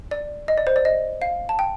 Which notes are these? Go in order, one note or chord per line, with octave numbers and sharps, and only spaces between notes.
D5
D#5
D5
C5
D5
D#5
F5
A5
G5